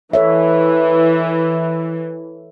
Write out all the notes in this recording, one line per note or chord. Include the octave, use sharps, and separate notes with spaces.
E3 A4 C#5 E5